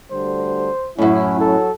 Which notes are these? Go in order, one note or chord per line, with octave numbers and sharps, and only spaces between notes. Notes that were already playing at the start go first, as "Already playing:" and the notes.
D2 D3 G3 C5
F#2 A2 C#4 E4
F#3 A4